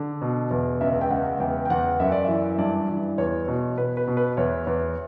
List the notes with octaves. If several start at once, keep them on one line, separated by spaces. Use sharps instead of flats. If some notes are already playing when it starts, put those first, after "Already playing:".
Already playing: D3
B2
E2
C#2 E5
G5
C#2 F#5
E2 G5
G5
E2 F#5
F#2 E5
D5
E3 E5
G2 D5
E3
E2 C#5
B2
B2 B4
B4
B2
B4
E2 C#5
E2